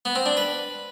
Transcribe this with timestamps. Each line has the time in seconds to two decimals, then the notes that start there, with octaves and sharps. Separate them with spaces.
0.05 B3
0.16 C4
0.26 D4
0.37 B4